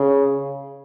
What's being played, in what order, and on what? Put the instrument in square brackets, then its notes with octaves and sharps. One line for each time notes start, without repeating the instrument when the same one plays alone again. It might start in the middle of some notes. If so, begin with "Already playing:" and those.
Already playing: [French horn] C#3